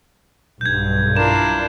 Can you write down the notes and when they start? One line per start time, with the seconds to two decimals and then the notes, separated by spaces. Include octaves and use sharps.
0.61 B1 G2 G6 G#6
1.17 D4 E4 F4 A#4 E7